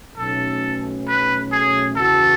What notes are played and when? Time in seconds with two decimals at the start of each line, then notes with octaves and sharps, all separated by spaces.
0.18 B1 B2 A3 C#4 A4
1.07 B4
1.52 G#4
1.96 E2 C#3 E3 B3 F#4 A4